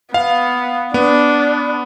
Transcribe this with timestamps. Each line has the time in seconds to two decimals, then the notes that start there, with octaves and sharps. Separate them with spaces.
0.14 B3 F5
0.94 B3 D4